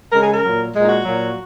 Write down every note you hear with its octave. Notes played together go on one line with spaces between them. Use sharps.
C#3 G#3 A#4
G#4
A#4
A#2 F#3
A#2 G#3
D#4
F#4
A#2 F#3